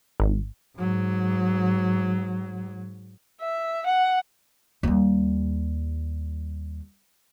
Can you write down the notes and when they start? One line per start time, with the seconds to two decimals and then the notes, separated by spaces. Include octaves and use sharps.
0.20 G#1
0.77 G#2 F#3
3.41 E5
3.86 F#5
4.83 D#2 G3